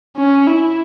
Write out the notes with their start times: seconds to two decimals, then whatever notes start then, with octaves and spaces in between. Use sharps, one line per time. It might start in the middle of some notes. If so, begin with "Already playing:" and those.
0.17 C#4
0.47 E4